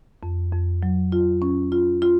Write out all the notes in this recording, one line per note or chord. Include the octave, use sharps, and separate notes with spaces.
F2
F2
F#3
F4
C#4
F4
F4